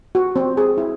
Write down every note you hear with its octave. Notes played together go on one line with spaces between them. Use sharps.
F#4
C4
G#4
E4